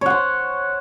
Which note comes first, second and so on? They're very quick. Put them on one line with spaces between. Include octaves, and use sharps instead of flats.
C#5 F#5 C5